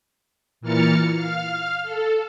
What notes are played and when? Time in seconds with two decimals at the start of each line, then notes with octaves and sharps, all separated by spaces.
0.61 A#2 E3 A#3 F6 A6 C#7
1.14 F5 F6
1.82 A4